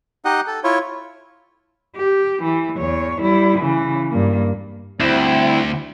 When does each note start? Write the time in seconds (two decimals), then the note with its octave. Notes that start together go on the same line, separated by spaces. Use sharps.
0.25 D#4 G4 D#5 F#5
0.47 A4
0.64 E4 F4 C#5
1.96 G4
2.43 E3
2.77 E2 C#5
3.21 G3 E4
3.59 C#3 E3
4.10 G2 A#3
5.00 D2 G3 C4 E4